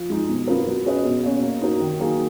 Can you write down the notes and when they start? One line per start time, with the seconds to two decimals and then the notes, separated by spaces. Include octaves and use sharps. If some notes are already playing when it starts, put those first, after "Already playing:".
Already playing: F3
0.10 G#3 D#4
0.29 B2
0.47 F#3 B3 F4 A#4
0.67 F#3
0.86 C#4 G#4 B4 D#5
1.05 B2
1.23 A#3 C#4 F#4
1.43 A#3
1.62 D#4 F#4 A#4
1.81 D#3
2.00 F#3 A#3 D#4 G#4